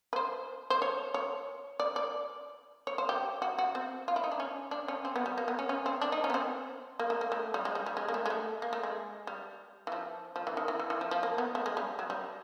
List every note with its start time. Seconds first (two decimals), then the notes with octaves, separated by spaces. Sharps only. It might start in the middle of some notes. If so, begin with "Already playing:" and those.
0.13 B4
0.16 C5
0.70 C5
0.82 C#5
1.14 C#5
1.80 D5
1.96 D5
2.87 C#5
2.98 C5
3.09 G4
3.42 F#4
3.59 F#4
3.75 C4
4.08 F4
4.16 E4
4.24 D#4
4.32 D4
4.40 C#4
4.71 D4
4.88 C#4
5.05 C4
5.16 B3
5.26 G3
5.38 A#3
5.48 B3
5.59 C#4
5.69 C#4
5.86 C4
6.01 D4
6.12 D#4
6.24 C#4
6.30 B3
6.34 C4
6.99 A#3
7.10 A3
7.21 A#3
7.32 A3
7.54 G3
7.65 G#3
7.75 G3
7.86 G3
7.97 G#3
8.08 A#3
8.14 A3
8.26 G#3
8.30 A3
8.62 A#3
8.73 A3
8.83 G#3
9.27 G3
9.87 E3
9.92 F3
10.36 F3
10.47 E3
10.57 D#3
10.68 E3
10.79 E3
10.90 E3
11.01 F3
11.11 F3
11.23 A#3
11.38 B3
11.55 A3
11.66 G#3
11.77 G3
11.99 F#3
12.10 G3